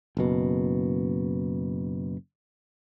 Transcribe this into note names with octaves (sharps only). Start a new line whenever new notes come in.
F#1 B2